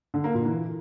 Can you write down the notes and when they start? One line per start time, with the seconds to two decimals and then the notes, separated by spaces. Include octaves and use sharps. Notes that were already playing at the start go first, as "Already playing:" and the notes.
0.14 D3
0.24 A#3
0.35 A#2
0.45 E3